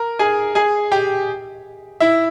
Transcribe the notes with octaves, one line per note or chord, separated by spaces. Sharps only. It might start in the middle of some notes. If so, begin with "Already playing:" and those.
Already playing: A#4
G#4 G#5
G#4 G#5
G4 G5
E4 E5